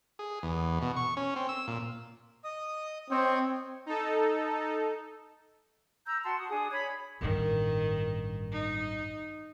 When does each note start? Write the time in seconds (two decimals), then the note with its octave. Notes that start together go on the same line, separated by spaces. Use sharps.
0.19 G#4
0.43 E2
0.82 B2
0.96 C#6
1.17 C#4
1.36 C4
1.49 E6
1.67 A#2
2.44 D#5 D#6
3.11 C4 C#5 D#5 G5
3.86 D#4 A4
6.06 A#5 E6 G6
6.23 F#4 F#5 A5 C6
6.39 F#4 D#6
6.50 D4 G#4 D#6
6.71 G#4 C#5 B5 G#6
7.21 A1 G2 D#3
8.52 D#4